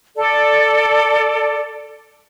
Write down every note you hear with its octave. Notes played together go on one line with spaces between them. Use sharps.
A4 D5